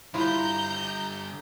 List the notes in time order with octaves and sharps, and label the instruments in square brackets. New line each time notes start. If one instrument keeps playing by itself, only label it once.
[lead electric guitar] D3 G3 [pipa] E4 F4 [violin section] A#5 G6